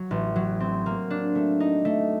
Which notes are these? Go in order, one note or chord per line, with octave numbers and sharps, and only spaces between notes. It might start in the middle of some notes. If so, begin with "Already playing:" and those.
Already playing: F#3
A1
F#3
C4
A#3
D4
A3
D#4
A3